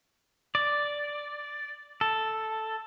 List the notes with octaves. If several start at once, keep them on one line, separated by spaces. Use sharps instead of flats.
D5
A4